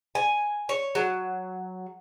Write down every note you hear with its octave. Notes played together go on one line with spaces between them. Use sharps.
G#5
C#5
F#3